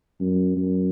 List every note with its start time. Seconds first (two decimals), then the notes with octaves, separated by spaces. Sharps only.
0.20 F#2
0.57 F#2